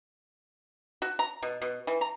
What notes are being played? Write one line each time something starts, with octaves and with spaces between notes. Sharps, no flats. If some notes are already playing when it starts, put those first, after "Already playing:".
F#4
A#5
B2
B2
E3
A#5